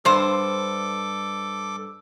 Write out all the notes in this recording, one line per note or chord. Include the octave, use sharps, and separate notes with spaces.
G2 A4 C5 D6